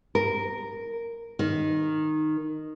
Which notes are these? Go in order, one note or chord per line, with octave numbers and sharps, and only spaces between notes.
A#4
D#3